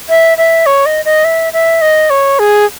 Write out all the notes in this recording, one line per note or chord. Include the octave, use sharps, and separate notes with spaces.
E5
E5
C#5
D#5
D#5
E5
E5
D#5
C#5
G#4